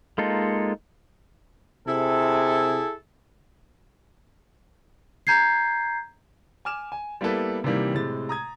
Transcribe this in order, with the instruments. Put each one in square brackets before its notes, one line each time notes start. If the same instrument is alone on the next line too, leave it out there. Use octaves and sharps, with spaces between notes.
[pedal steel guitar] G#3 A#3 D#4 F4 A4
[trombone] C3 [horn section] E4 G#4 A4
[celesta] A#5 G6 G#6 C7
[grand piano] G#5 D6 F6 E7
G#5
G3 A#3 B3 E4 A4 B4
C3 D#3 E3 G3 A#3
A2 C3 G#3 A6
A#5 D#6 G#6